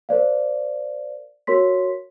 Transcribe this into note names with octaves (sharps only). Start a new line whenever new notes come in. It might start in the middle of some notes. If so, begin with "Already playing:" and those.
A#4 C5 D5 F5
F#4 A#4 C#5 C6 B6